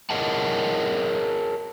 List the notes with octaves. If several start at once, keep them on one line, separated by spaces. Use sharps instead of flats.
G#4 A#4 C#5 D#5 F#5 A5